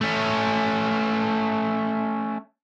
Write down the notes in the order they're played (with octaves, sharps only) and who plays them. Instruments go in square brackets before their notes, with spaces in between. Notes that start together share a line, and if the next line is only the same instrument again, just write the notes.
[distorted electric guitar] A3 C#4